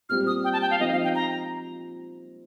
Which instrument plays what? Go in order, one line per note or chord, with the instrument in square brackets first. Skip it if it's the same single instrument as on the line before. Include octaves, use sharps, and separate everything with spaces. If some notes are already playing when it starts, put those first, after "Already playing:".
[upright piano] A#2 G3 C4 G4 [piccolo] F6
[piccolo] D#6
G5
A5
G5
F5
[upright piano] F3 C4 D#4 [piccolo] D#5
[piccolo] F5
G5
A#5